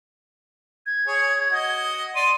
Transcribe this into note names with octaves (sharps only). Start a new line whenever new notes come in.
G#6
G#4 C#5
F#4 D#5
D5 C6 D#7